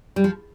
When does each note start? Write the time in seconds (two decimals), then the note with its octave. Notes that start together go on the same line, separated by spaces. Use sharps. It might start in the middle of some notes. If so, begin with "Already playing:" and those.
0.16 G3
0.24 F3